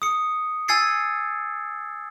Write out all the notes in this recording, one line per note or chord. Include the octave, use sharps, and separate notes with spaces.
D#6 C#7
G#5 E6 G#6 A6 C7 C#7